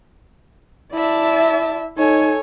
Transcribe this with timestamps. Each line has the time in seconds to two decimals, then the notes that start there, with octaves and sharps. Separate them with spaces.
0.94 E4 D5 E5 A5
1.97 D#4 A4 C#5 G#5